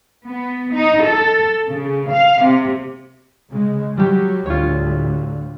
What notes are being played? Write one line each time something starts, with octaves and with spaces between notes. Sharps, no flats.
B3
D#4
A4
C#3
F5
C3
C#3 G#3
F#3 G3 G4
D2 A2 D3 F4 C#5